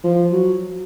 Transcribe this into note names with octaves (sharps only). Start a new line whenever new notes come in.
F3
F#3